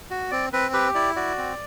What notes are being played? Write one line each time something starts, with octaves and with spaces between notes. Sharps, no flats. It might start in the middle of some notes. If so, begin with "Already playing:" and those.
F#4
C4 D5
C4 B4
G4 B4
E4 D5
F#4 D5
C4